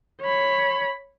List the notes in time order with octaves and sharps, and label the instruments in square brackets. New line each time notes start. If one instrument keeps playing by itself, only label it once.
[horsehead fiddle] C#5 B5